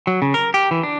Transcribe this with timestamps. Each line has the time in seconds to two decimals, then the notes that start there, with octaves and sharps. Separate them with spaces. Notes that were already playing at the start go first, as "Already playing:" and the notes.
0.07 F#3
0.22 C#3
0.34 A#4
0.54 G4
0.71 E3
0.83 D4